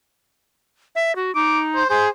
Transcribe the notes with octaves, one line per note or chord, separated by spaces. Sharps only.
E5
F#4
D#4 D6
C5
G#4 C5